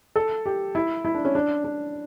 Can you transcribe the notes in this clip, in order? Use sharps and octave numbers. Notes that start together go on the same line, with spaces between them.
A4
G4
E4
E4
D4
C#4
D4
D4